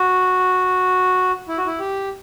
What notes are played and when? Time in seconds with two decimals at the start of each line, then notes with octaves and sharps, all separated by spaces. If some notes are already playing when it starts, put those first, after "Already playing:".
Already playing: F#4
1.48 E4
1.58 F#4
1.67 E4
1.80 G4